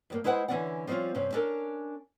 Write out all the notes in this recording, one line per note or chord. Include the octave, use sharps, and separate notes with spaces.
G2 G3 A#3
G#3 E4 B4 C5 F5 F#5
D3 E3 C#4 D4 D5 F#5
F3 G3 C4 C#4 F4
G2 C3 C#4
C#4 D4 A4 A#4